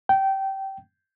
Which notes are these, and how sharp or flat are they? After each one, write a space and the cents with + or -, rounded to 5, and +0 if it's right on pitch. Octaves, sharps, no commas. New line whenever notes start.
G5 -20